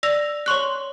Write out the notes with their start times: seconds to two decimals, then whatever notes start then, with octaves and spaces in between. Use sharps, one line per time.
0.03 D5 E6 A#6 F7
0.46 C#5 C6 C#6 F#6